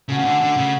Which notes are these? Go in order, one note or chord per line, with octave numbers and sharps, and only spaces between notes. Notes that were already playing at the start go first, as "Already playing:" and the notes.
C#3 A3 C#4 F#4 A4
C#3
D3
D3
C#3